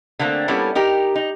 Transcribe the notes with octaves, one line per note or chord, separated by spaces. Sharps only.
D3 A3 A#3 C4
G3 A#3 B3 C#4 E4 A4
D#4 G4 A#4
D#4